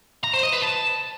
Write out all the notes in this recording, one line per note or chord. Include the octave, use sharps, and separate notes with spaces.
A#5
C5
D#5
B4
A5